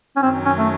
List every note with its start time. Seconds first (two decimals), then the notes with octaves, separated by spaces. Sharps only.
0.16 C#4
0.22 F#2 D#3 F#3 C4
0.45 C#4
0.58 A3